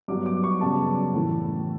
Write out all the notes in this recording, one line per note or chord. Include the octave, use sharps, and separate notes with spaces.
G2 F#3 B3 D6
D6
C#6
F#2 C#3 G3 B3 A5
A2 E3 A3